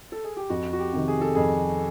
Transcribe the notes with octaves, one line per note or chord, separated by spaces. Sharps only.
A4
G#4
G4
F2 F#4
F#4
G4
C3 D#3
G#4
A4
F2 G#4